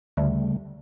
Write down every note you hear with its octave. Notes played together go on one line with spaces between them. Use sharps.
D2 C#3 G3 A3